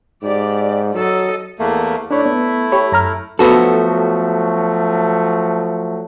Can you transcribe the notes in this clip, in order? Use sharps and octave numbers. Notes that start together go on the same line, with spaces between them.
G#2 G4 D5
F#3 A4 D#5
E2 A3 A#3
A3 D4 E4 C#5 D5
B3
G4 C#5 B5
F#2 A#5 F6
F3 F#3 A3 B3 F#4 A4